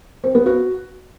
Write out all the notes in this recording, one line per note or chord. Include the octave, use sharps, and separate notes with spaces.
C4
B3
F#4